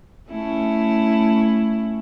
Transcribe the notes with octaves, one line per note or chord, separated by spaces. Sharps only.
A3 C#4 E4